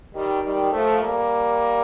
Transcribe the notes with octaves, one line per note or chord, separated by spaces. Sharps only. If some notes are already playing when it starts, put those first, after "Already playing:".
D#3 G3
D#3 G3
F3 A3
G3 A#3